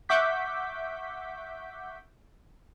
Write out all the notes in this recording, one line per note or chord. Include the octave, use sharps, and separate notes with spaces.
E5 F#5 C#6 D6 G6 B6